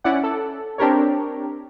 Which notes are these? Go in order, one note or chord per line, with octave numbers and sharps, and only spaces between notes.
C#4 E4 D5 F#5
A4
C4 D4 G4 A#4 C#5